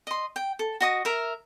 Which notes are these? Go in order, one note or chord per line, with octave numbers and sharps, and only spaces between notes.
D#5 C6
G5
A4
F#4 D#5 D#6
A#4 E5